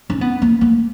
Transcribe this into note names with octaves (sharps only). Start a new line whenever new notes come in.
C#4
B3
A#3
A#3